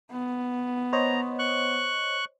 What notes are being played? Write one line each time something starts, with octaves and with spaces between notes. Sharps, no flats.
B3
C5 C#5 D#5 A#5
C#6 F#6